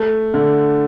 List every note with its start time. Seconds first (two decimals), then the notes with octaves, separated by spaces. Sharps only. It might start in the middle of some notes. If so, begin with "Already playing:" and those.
Already playing: A3
0.34 D3